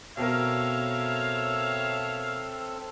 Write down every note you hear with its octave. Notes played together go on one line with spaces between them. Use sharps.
B2 C4 A4 A#4 C#5 E5 F5